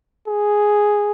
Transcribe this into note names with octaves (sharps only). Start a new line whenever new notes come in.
G#4